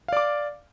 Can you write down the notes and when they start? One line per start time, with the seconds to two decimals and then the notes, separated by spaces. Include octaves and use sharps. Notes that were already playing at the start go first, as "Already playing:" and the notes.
0.08 F5
0.13 D5
0.17 D6